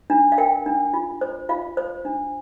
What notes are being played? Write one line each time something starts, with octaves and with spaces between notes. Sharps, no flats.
D4
F5
A#4 G5
D4
F4
C5
F4 F5
C5
D4